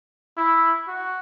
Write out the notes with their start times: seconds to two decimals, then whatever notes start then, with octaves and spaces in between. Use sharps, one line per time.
0.37 E4
0.88 F#4